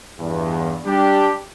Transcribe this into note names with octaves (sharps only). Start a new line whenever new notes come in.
E2 G2
G3 D4 G4